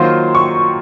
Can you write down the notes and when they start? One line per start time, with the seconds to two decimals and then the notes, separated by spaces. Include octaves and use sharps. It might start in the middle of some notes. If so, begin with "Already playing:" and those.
Already playing: D#3 F#3 A#3 F4 C5 C6
0.35 C#6